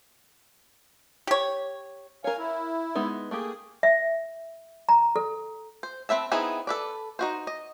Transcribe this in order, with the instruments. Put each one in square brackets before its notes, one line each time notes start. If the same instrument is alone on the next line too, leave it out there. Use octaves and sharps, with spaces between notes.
[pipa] G4 C#5
[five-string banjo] A#4 C#5 [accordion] F5 G#5
[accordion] E4
[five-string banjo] G#3 B3 D#4
[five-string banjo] A3 A#3 G4 [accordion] G#4
[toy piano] E5
A#5
A4
[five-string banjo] C5
C4 B4 E5 A5
B3 C4 D#4 E4 G#4
A4 B4 D5
D#4 F#4 C5
D#5